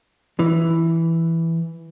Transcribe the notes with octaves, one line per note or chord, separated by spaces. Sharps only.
E3